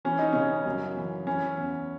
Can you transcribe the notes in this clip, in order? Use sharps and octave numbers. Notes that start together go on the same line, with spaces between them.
E3 C#4
D#4
C#3 C#4
F#2
E3
E3 C#4
E2